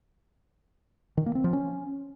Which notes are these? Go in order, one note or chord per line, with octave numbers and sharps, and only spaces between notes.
D#3
A#3
C4
F3
C#4